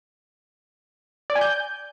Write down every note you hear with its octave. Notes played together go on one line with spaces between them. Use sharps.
D5
G#5
G6